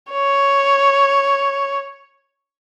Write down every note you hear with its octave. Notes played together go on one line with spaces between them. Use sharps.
C#5